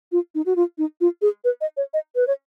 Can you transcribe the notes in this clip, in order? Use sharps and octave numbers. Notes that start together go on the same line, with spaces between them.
F4
D#4
F#4
F4
D#4
F4
G#4
B4
D#5
C#5
D#5
B4
C#5